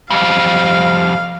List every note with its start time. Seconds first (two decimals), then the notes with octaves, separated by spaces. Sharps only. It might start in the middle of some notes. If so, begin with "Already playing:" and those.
0.10 F2 G3 F5